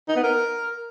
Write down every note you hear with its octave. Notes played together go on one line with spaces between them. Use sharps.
D#4
B3
A#4